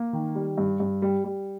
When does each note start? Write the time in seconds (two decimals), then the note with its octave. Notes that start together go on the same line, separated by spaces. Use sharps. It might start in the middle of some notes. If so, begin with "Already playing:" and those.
Already playing: A#3
0.13 D#3
0.35 G3
0.58 G2
0.80 G2
1.02 G3
1.24 G3